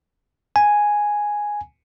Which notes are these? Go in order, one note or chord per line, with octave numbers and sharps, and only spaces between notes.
G#5